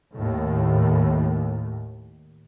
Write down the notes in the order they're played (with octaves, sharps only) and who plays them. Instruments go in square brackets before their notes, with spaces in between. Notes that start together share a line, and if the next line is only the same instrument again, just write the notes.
[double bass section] D#2 A2